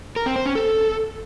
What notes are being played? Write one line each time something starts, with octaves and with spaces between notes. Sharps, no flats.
A#4
C4
C5
C#4
A4